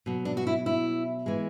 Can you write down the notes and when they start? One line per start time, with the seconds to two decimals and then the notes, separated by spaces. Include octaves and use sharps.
0.06 B2 F#3
0.25 D4
0.37 F#4
0.47 E4
0.66 E4
1.26 E3 G#3